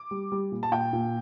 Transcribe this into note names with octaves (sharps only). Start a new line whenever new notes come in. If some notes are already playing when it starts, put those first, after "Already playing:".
Already playing: D6
G3
G3
A#2
A5
A#2 G5
A#2